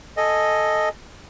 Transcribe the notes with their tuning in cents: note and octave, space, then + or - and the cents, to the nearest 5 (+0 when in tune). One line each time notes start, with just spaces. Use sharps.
A4 +0 D#5 +0 G#5 +0